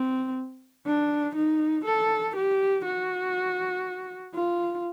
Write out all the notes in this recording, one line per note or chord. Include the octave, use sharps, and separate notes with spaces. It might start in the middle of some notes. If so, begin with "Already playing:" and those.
Already playing: C4
D4
D#4
A4
G4
F#4
F4